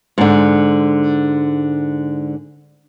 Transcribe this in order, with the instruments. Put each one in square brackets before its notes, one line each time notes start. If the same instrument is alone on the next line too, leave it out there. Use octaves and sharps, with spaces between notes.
[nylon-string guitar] G#2 D3